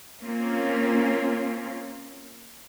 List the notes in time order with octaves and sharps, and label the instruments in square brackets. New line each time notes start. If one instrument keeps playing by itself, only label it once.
[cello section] A#3 C4 C#4 F4